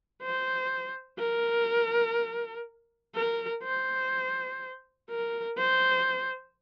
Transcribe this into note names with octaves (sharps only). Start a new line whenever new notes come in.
C5
A#4
A#4
C5
A#4
C5